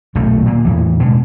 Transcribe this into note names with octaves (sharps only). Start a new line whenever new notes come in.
D#1 B1 F#2 A3
A#2 A#3
E2 A2 E3
B2 D3 G#3